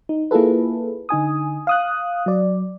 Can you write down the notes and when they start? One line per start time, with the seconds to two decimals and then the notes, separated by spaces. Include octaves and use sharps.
0.09 D#4
0.31 A#3 E4 F4 G#4 A4 B4
1.09 D3 D#4 G#5 D#6
1.67 F5 D#6 F#6
2.26 F#3 D5